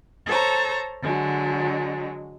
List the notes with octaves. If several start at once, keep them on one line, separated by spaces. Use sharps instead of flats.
A4 C5 C#5 A#5
D3 F#3 G#3